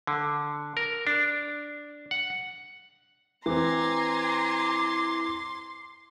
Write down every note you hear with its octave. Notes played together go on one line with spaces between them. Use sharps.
D3
A#4
D4
F#5
E3 C4 G#5 A#5 C6 D6